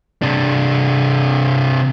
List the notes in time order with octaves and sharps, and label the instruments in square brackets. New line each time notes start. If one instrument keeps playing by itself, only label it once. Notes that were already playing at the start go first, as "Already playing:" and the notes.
[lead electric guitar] C3 D4